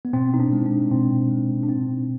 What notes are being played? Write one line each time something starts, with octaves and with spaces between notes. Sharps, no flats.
B3
B2 C4
D#4
D4
G#3
D4
B2 C4
G#3
D4
B2 C4